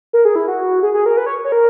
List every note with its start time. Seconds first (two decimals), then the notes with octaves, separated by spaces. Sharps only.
0.13 A#4
0.25 G#4
0.35 E4
0.48 F#4
0.83 G#4
0.94 G#4
1.06 A#4
1.17 B4
1.26 C#5
1.45 C#5
1.52 A#4